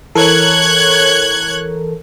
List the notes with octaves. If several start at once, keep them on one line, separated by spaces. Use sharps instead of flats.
E3 A4 A#4 C#5 F#6 G#6